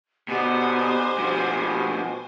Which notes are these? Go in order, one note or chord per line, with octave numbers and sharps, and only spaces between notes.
B2 D3 B3 D#4 G4 C5 G#5
G2 B2 F3